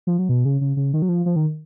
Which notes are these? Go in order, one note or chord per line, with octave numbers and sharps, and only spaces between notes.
F3
F#3
B2
C#3
C#3
C#3
D#3
F#3
F3
F3
D#3